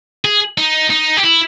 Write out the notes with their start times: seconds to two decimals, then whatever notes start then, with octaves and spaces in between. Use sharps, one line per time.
0.25 G#4
0.58 D#4
0.90 D#4
1.17 G4
1.23 E4